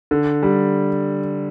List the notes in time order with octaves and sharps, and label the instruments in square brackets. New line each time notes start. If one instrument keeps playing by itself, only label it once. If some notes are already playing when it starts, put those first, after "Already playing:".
[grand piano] D3
G3